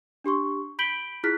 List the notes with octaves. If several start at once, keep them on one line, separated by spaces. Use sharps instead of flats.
D4 G4 C6 C#6
B5 G6 B6 D7 F#7 G7
E4 F4 G#4 F6 F#6 B6